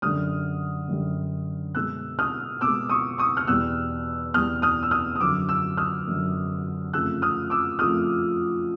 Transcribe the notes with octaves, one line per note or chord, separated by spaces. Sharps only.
F#2 D3 G3 D#6 F6
F#2 D3 G3
B2 G#3 E6 F#6
D#6 F6
B2 G#3 D6 E6
C#6 D#6
C#6 D#6
F6
E2 B2 G3 E6 F#6
E2 B2 G3 D#6 F6
D#6 F6
E6
D#6 F6
D#6
F#2 D3 F#3 D6 E6
D6 E6
D#6 F6
F#2 D3 F#3
F2 C#3 F3 A3 E6 F#6
D#6 F6
D6 E6
F2 C#3 F3 A3 D#6 F6